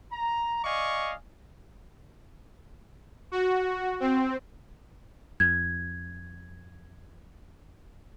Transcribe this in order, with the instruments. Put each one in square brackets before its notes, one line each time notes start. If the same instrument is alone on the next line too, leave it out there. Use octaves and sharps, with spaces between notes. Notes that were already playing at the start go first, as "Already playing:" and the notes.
[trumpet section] A#5
D5 D#5 F5 G#5 C#6
[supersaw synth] F#4
C4
[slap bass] F2 [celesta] G#6